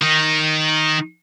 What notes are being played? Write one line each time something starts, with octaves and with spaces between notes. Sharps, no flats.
D#3 D#4